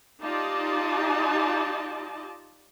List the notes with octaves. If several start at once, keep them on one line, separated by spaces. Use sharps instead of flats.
D#4 F4 G4 D5 D#5 A5